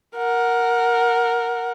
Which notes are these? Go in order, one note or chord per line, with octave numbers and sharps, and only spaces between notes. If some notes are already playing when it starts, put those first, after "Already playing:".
A#4 F#5